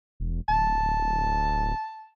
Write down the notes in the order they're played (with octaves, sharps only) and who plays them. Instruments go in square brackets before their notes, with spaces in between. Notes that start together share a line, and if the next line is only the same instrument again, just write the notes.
[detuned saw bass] E1
[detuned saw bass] D1 [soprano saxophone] A5